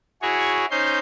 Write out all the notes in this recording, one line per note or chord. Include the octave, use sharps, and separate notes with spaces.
E4 F#4 G#4 C#5
C#4 D#4 C5 C6 G6